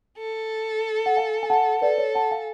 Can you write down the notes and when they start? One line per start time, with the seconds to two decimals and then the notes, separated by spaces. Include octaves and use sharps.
0.18 A4
1.06 F#5
1.17 F5 G#5
1.43 G#5
1.50 F#5 A5
1.82 A4 B4 D5
1.98 C#5
2.15 F#5 A5
2.31 F5 G#5